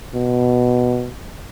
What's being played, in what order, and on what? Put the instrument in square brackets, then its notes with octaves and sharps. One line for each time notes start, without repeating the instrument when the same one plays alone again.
[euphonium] B2